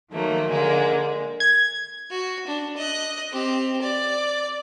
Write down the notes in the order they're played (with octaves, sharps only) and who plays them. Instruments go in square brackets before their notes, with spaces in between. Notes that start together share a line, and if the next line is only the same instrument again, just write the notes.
[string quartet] D#3 F3 F#3 A3 A#3
D3 G#3 A#3
[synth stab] G#6
[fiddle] F#4
D4
D#5 F#6
C4 G4
D5